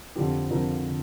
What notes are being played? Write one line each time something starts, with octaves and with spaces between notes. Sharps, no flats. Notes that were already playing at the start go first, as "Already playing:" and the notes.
F2 D3 F3 G4
F2 D3 F3 A#4
D3